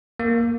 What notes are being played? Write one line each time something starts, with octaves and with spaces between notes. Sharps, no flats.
A#3